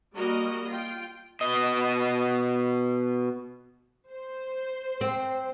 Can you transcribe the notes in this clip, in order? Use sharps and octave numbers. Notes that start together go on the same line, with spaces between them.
G3 A#3 F#4 A#4 D#5
F4 G5
B2 D#5
C5
C4